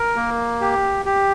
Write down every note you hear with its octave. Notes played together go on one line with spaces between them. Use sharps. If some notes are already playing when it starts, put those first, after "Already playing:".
Already playing: A#4
A#3
G4
G4